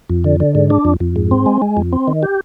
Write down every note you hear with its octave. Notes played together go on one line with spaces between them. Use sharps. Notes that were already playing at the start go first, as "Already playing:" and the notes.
F2
D3
D3
G#2
D4
F2
F2
G#2
C4
G#3
G#3
F2
C4
D#3
G4